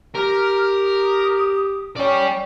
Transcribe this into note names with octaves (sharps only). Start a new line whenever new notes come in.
G4 A#4 F6
D#6
C#4 D5 G5 C#6